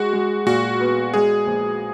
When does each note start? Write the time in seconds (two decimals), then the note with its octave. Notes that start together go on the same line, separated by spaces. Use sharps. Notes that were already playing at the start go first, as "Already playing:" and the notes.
Already playing: G#3 F#4
0.13 G#3
0.46 A#2 F#4
0.80 B3
1.14 G#3 G#4
1.46 A#1